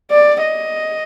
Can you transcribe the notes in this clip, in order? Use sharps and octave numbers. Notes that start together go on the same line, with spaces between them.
D5
D#5